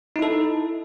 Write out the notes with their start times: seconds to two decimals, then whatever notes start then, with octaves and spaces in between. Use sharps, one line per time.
0.16 D#4
0.19 E4
0.22 A4